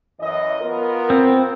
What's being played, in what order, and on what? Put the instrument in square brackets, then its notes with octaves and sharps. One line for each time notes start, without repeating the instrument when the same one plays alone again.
[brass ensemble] F#2 E3 D#5
B3 F4 A#4
[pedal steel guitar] C4